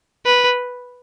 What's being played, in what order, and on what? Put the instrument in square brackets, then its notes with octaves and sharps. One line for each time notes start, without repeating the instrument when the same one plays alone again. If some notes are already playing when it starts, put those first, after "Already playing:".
[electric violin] B4